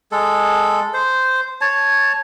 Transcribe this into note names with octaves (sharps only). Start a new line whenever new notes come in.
G#3 A4
C5
C#5 A5